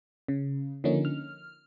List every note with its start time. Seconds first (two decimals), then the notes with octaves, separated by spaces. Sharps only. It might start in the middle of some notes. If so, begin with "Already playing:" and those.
0.28 C#3
0.84 D3 F3 A#3 C#4 D#4
1.05 F6